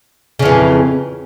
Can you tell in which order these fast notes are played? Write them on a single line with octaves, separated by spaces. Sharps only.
C#3 F2 E3